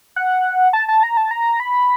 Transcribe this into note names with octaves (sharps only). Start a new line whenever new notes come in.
F#5
A5
A5
A#5
A5
A#5
B5